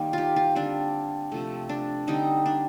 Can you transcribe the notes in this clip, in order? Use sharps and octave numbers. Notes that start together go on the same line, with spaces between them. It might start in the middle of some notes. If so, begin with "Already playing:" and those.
Already playing: D#3 G3 A#3
F4 G4
F4
D3 G3 C4 D4
C3 F3 A3
D4
D3 G3 C4 D#4
D4